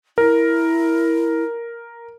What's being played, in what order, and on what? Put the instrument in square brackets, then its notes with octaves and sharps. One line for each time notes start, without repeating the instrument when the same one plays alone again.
[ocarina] E4 [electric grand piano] A#4